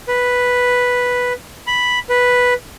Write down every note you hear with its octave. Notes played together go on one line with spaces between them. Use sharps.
B4
B5
B4